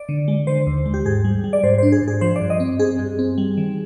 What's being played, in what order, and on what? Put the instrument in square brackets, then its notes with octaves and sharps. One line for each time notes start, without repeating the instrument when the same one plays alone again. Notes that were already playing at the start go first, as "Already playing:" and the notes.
Already playing: [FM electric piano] D5
D3
G#3
D3 C5
D#2
G#3
G4
G#2 G#4
G3
G3
D5
G#2 C5
D4 C5
G#4
G#2
G#4
F3 C5
D5
G2
D#5
C4
C4 G#4
G2
C4
G3
D#3